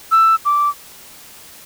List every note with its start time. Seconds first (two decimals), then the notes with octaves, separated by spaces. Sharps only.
0.11 E6
0.45 D6